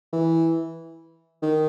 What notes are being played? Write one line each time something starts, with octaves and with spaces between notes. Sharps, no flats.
E3
D#3